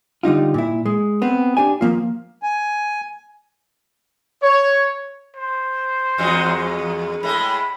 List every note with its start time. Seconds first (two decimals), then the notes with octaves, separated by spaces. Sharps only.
0.23 D3 G3 D#4 F4
0.54 A#2 E4
0.86 G#3
1.22 B3 C4
1.57 D4 G4 D5 G#5
1.81 F3 A3 A#3 F4
2.43 G#5
4.43 C#5
5.36 C5
6.18 E2 G#3 F#4
7.23 A2 G#3 B5